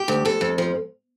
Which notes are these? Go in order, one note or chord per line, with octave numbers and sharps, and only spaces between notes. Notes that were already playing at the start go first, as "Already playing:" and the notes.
Already playing: G4
D2
F2 A4
F2
F3